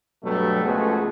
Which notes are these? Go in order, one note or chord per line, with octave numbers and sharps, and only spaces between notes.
G2 B2 F#3 G3 A3
C#2 F3 A3 B3 F#4 G#4